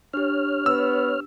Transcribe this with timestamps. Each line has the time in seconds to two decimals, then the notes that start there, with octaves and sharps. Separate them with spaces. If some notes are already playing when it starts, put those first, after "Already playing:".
0.13 D4 G4 C#5 F6
0.66 B3 E6